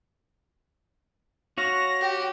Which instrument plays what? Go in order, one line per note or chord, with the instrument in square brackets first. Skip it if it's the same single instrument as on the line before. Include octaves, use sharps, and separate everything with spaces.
[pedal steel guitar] F#4 C#5 F5 [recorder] A#6
[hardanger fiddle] G4